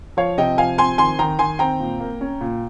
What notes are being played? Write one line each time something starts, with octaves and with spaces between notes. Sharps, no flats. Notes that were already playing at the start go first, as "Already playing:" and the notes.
F3 C#5 F5
C3 D#5 G5
F3 F5 G#5
C4 G#5 C6
D#3 G#5 C6
D#3 G5 A#5
D#3 G#5 C6
C4 G5 A#5
A#2
A#3
C#4
A#2